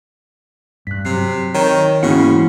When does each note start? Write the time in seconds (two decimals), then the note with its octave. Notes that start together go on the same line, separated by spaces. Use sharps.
0.87 G2 F#6 B6
1.05 C3 F#3 C7
1.55 D#3 C#5
2.03 G#2 C#3 E3 A#3 B3 E4 F#4 F#5